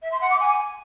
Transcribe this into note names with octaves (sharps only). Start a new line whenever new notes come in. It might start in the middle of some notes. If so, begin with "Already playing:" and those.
E5
C6
F#5
D6
G#5